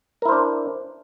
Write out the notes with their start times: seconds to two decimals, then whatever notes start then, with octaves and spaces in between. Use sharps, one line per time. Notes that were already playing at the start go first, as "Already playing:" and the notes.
0.22 A#4
0.25 E4
0.29 C5
0.32 D4